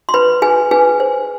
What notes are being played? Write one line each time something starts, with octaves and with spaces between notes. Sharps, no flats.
C6
B4 B5
G#4 B4 G#5
G#4 B4 G#5
C5